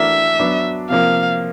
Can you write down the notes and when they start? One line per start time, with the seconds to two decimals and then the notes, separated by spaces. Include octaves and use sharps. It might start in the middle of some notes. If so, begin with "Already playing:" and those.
Already playing: E3 A3 D4 F#4 A#4 E5
0.39 F#3 B3 D4
0.90 C3 F3 A#3 F5